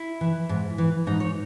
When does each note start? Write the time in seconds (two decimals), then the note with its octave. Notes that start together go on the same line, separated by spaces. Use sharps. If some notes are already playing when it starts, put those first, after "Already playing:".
Already playing: E4
0.21 E3
0.49 G#2
0.78 E3
1.07 G#2 D#4
1.20 C#5